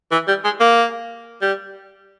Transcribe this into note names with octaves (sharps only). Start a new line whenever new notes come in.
E3
G3
G#3
A#3
G3